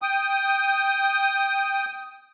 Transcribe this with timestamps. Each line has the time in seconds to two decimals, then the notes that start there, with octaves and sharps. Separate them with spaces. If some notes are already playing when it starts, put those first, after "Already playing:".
0.02 G5 D#6